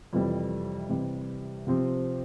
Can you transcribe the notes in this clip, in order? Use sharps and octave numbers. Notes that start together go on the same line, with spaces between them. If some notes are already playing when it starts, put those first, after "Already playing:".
F2 C3 E3 G3
C3 E3 G3
C3 F3 C4 G4